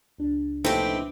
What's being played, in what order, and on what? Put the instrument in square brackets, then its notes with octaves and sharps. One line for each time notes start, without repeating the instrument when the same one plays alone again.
[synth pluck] C#2 D4
[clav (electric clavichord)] A#1 C3 A3 [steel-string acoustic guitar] C4 G4 [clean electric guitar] D#4 E4 B4